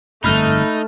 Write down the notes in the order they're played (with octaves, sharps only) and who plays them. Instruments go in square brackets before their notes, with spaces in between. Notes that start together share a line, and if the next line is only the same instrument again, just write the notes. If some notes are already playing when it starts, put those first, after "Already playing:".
[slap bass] G1 F2 G#2 [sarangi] A3 [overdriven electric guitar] D#4 [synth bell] B5 F6